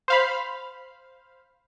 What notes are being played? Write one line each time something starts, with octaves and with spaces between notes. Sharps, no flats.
C5 F5 B5